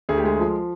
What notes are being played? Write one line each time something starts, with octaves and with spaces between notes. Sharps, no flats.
D2 G#4
G4
G#3 G#4
F3